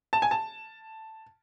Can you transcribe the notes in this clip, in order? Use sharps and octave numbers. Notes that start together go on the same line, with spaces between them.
A5
G#5
A5